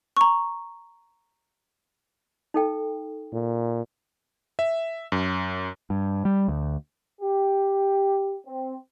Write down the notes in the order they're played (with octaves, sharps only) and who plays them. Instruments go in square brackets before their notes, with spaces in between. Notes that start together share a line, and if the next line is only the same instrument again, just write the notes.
[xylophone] A#5 C#6
[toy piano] D#4 A4 G5
[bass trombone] A#2
[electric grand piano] E5
F#2
[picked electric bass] G2
G3
D2
[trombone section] G4
C4